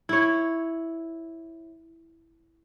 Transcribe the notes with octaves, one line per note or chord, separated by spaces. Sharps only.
E4 C#5